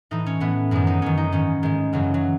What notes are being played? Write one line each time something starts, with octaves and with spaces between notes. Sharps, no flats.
A2 E3 D#4
C#4
A2 E3 B3
F#2 D#3 G#3
D#4
F#2 D#3 C#4
D#4
G#2 D#3 C#4
G#2 D#3 G#3
F#2 C#3 E3 F#3
F#3